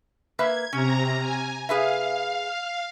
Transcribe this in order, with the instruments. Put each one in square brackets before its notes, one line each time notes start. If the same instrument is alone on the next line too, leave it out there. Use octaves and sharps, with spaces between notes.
[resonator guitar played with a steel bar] A#3 B4 E5 [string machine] G#6
[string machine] C3 A#5 [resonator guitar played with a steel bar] C#4
[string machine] G#5
[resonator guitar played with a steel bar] G#4 B4 E5 [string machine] F5